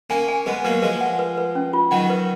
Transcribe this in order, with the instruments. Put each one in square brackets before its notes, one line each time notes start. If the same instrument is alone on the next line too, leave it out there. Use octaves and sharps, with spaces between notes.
[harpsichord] A#3 C#4 [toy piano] G#5
[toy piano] G#5
[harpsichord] G#3 B3 [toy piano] B4
[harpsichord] F#3 A#3 [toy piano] B4
[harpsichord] F3 G#3 [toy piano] B4
[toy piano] F#5
B4
B4
C#4
F4
[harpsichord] D#3 F#3 [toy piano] F#5
[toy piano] B4